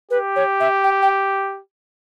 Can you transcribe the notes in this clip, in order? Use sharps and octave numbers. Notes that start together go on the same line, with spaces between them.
G4 B4
C#5
E5
G5
G5